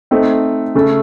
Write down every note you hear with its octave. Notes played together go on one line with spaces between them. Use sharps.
A3 C4 D#4
C#3 A3 C#4 A4